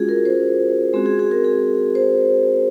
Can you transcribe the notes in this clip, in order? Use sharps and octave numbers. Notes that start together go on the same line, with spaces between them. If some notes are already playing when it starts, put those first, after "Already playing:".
Already playing: G#3 C#4 F4 F#4 G#4
A#4
C5
G#3 C4 F#4 G#4
G#4
G#4
A#4
G#4
C5